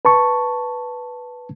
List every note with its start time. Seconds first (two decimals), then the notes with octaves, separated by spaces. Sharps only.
0.05 B4 A5 C#6